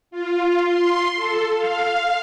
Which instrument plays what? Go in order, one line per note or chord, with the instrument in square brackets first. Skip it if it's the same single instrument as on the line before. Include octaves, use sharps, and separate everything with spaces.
[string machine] F4
C6
A4
F5